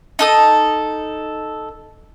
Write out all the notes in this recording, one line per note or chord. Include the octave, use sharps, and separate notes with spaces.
D#4 A4 D#6